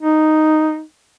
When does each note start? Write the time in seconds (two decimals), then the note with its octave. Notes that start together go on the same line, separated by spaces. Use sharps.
0.01 D#4